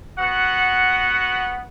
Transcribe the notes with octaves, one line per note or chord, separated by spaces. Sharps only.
B3 F#4 F#5